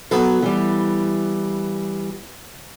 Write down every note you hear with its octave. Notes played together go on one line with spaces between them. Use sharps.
F#3 B3 A4
E3 G3